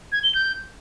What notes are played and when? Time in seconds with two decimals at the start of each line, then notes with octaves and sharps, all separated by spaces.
0.12 G#6
0.23 G7
0.35 G6